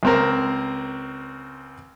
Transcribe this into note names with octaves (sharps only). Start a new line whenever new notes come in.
C#2 C4 A#4